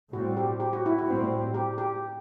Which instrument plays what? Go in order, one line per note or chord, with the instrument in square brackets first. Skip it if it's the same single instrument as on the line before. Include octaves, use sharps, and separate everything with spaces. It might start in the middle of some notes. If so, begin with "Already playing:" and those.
[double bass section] A2 G3 C4 [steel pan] F#4
[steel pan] G4
G4
F#4
E4
F#4
[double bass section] A2 G3 C4
[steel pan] G4
G4